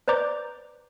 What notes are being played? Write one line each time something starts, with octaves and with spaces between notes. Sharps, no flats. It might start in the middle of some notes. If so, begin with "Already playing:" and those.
B4 C5 D5 A#5 D6 G6